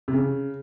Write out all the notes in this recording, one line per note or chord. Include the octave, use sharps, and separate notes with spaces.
C3
C#3